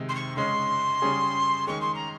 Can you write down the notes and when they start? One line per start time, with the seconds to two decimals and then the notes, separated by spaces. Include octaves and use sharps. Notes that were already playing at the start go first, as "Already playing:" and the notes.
Already playing: C3 D#3 G#3 D#4
0.08 C6
0.15 C#6
0.36 C#3 G#3 C#4 C6
1.02 C#3 G3 C#4 G#4
1.67 D#3 G#3 C#4 G#4 C#6
1.81 C6
1.94 A#5